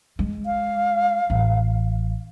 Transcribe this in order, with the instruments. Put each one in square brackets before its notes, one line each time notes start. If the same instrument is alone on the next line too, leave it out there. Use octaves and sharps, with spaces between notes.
[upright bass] G#3
[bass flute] F5
[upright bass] A1